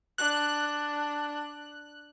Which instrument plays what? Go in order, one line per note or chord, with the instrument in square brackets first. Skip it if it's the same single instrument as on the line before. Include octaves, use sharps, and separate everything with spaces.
[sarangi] D4 [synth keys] F#6